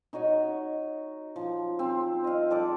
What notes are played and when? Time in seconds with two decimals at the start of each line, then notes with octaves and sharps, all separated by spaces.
0.13 D#4 F#4 C#5 D#5
1.36 F3
1.79 C4
2.24 D#5 F5
2.50 F3 A4 D5 D6